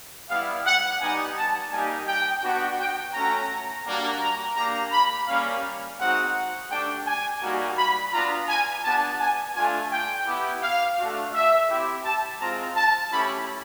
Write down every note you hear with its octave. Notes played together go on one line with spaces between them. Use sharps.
G3 B3 E4 F5
F#5
G3 B3 D#4 G4 G#5
A5
G3 A#3 D#4 G4 G#5
G5
B3 D4 F#4
G5
A3 C#4 F#4 A#5
G3 A#3 D4 F#4
A#5
A#3 D4 G4 A#5
B5
G3 A#3 C#4 F5
G#3 C4 D#4 F#4 F#5
A3 D4 G4 G5
G#5
G3 A#3 D#4 F#4
B5
B3 D4 F4 A#5
G#5
B3 D4 G4 A5
G#5
A3 D4 F4 G#5
G5
B3 E4 G4
F5
A3 D4 F#4
E5
C4 E4 G4
A5
G#3 C4 F4 A#5
A5
A3 C#4 E4 G4 B5